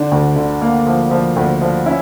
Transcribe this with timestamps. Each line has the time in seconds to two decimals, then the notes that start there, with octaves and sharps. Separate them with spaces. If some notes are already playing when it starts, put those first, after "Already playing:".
Already playing: D3 D4
0.11 D2
0.36 D3
0.62 A#3
0.87 F3
1.11 F3
1.36 D2
1.62 F3
1.86 C#4 E4